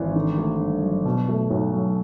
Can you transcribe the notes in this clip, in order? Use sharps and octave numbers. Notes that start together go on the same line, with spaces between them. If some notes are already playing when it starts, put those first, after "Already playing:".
Already playing: G#1 E3
D3
A3
G2
F#3
B2
A3
B1
F#3